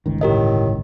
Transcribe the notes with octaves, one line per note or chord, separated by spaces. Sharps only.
G1 C#2 D#3
A2 G4 A#4 D#5